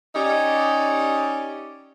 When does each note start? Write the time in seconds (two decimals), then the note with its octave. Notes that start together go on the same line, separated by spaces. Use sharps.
0.15 C#4 D#4 G4 D5